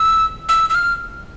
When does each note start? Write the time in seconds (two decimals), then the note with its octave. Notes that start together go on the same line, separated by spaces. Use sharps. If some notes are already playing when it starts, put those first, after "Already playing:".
Already playing: E6
0.49 E6
0.70 E6
0.75 F6